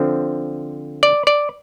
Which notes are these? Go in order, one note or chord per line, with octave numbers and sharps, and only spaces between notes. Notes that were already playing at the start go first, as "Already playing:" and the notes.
Already playing: D3 F3 C4
D5
D5